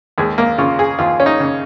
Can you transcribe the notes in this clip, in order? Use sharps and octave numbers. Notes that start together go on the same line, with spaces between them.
D#2 G#3
A#3
C#3 F4
G#4
D#2 F4
C#4
D#4
C#3